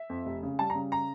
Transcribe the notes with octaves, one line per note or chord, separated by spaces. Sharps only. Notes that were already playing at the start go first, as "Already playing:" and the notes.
Already playing: E5
F2
F1
C#3
G3 A5
A#5
C#3
A#5